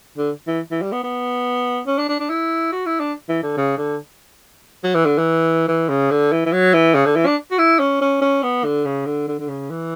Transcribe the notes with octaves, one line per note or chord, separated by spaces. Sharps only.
D3
E3
E3
G3
B3
B3
C#4
D4
D4
D4
E4
F#4
E4
D4
E3
D3
C#3
D3
F#3
E3
D3
E3
E3
C#3
D3
E3
E3
F#3
E3
C#3
D3
E3
D4
F#4
E4
C#4
C#4
C#4
B3
D3
C#3
D3
D3
D3
C#3
E3